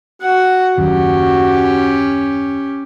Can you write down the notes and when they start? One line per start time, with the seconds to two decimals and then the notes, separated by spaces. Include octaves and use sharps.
0.22 F#4 F#5
0.77 F#1 D#2 C#4 G4